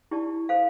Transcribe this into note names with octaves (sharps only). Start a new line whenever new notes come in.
E4 G4 D5 A5
A4 C5 F5